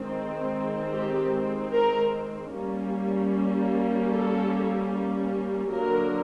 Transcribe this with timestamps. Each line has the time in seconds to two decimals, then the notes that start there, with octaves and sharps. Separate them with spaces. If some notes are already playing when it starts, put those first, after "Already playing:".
Already playing: D#3 G#3 C4
0.92 G4
1.72 A#4
2.52 G3 A#3 C#4
4.11 A4
5.71 D3 F#3 A#3 A#4